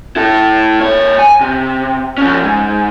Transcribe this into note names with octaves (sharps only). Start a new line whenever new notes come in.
E4 A4
A#2 C#5
G#5
C3
F3 C#4
G#2